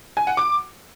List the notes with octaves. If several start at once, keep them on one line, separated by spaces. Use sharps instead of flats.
G#5
F#5
D6